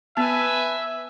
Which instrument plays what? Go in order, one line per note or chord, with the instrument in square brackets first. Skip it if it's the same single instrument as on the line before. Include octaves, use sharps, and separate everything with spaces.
[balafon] B3 A5 [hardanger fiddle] B4 G#5 [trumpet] E5